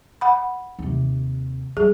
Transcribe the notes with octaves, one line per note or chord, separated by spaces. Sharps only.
F#5 B5
D#2 C3
G3 G#4